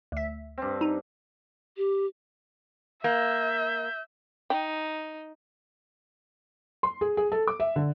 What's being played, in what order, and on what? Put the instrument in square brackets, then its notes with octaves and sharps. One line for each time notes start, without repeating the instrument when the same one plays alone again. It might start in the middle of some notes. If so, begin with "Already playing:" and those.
[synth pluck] D2 E5
[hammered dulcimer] G2 C4
[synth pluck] D#4
[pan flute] G4
[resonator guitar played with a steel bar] A#3 [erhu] E5 [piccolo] G6
[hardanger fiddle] D#4 [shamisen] G5
[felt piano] C6
G#4
G#4
A4
D6
E5
D3